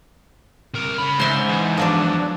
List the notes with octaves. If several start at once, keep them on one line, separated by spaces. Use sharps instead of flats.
C2 A#4
C#3 B5
G#2 C5 E5
E2
F3 F#3 D4